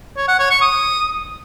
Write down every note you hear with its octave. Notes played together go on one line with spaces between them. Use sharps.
C#5
F#5
C#5
C#6
D#6